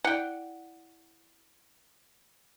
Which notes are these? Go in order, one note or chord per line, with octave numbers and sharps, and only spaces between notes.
E4 D5 F#5 G5